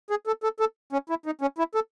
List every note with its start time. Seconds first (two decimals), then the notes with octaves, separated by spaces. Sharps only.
0.10 G#4
0.27 A4
0.43 A4
0.60 A4
0.93 C#4
1.10 E4
1.26 D#4
1.41 C#4
1.58 E4
1.75 A4